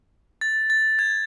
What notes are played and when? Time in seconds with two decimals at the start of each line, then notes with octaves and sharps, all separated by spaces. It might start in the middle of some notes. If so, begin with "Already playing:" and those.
0.41 A6
0.70 A6
0.99 G#6